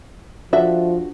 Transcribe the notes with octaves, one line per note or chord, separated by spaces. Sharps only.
F3 D4 F#4 A4 E5